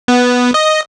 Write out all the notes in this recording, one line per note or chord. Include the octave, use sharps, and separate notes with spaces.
B3
D#5